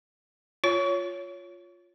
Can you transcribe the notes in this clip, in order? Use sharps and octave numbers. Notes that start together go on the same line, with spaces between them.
F4 C#5